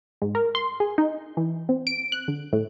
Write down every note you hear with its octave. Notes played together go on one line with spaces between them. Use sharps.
G#2
A#4
C6
G#4
D#4
E3
C4
D7
F#6
D3
A2